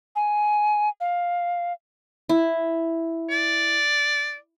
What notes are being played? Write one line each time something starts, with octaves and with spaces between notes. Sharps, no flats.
G#5
F5
E4
D5